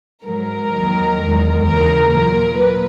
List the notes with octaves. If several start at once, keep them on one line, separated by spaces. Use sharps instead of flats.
G#2 F#3 A#4
D#2 D#3 F#3
E2 D#3 G#3
D#2 C#3 E3 A#4
A#2 F#3 A#4
A#2 B4